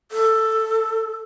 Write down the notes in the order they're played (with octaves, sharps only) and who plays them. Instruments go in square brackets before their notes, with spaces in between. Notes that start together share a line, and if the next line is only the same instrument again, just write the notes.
[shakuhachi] A4